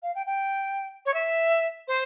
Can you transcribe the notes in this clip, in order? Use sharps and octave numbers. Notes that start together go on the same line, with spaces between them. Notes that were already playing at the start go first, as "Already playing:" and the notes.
F5
G5
G5
C#5
E5
C5